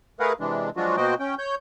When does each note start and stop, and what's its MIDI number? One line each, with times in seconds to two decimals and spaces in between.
0.20 0.33 57
0.20 0.33 68
0.20 0.33 70
0.20 0.33 71
0.20 0.33 77
0.20 0.33 78
0.40 0.70 48
0.40 0.70 52
0.40 0.70 56
0.40 0.70 62
0.76 0.96 53
0.76 0.96 54
0.76 0.96 56
0.76 0.96 62
0.76 0.96 65
0.76 0.96 66
0.97 1.14 47
0.97 1.14 58
0.97 1.14 66
0.97 1.14 72
0.97 1.14 75
0.97 1.14 79
1.20 1.35 61
1.20 1.35 79
1.39 1.55 73
1.39 1.55 91